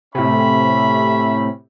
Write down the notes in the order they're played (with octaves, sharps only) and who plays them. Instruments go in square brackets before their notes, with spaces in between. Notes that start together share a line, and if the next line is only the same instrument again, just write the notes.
[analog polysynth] A2 C3 [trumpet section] C#4 E5 B5